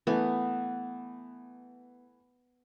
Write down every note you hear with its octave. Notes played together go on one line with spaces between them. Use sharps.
E3 A3 B3